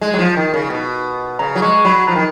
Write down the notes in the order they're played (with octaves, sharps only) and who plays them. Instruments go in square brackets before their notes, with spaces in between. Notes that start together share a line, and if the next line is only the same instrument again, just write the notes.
[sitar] G#3
F#3
F3
D#3
C#3
B2
[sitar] C#3 [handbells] A#5
[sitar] F#3
[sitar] G#3 [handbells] C#6
[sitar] F#3 [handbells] B5
[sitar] F3 [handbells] A#5
[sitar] D#3